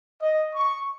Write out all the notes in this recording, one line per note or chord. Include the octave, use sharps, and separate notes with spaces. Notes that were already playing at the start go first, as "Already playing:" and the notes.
D#5
C#6